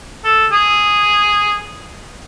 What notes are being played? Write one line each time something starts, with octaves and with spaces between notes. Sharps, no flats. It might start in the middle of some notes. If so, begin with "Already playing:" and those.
A4
G#4